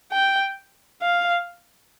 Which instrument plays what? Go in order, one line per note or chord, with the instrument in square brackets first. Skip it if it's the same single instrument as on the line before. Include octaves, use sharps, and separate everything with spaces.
[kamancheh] G5
F5